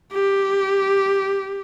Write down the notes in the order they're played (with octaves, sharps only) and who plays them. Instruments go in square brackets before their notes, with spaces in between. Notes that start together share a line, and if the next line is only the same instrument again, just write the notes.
[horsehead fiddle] G4